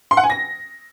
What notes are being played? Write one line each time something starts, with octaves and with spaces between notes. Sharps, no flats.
C6
F#5
G#5
A#6